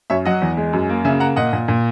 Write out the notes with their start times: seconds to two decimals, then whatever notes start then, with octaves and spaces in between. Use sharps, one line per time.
0.10 F#2 C#5 E5
0.25 F#3 D#5 F#5
0.42 E2
0.57 G#3
0.73 F#2
0.89 A#3
1.05 C#3 E5 G#5
1.20 A#3 F#5 A#5
1.36 A#2 D#5 F#5
1.53 A#2
1.68 A#2